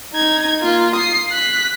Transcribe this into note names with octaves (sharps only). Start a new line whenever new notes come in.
D#4 G#6
A#3 F4
D#6 C7
F#6 B6